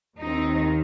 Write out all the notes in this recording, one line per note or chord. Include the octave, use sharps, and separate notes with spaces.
D#2 D#3 C4 D#4